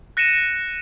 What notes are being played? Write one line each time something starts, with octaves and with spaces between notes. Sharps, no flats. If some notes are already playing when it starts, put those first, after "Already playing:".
F#6 A#6 C#7 D#7 E7